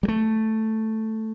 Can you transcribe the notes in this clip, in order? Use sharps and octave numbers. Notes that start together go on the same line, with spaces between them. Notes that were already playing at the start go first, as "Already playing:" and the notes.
G3
A3